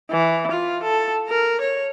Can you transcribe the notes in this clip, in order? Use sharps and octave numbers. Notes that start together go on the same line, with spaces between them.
E3
F4
A4
A#4
C#5